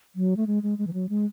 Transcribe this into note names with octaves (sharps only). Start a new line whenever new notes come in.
F#3
A3
G#3
G#3
G#3
E3
F#3
G#3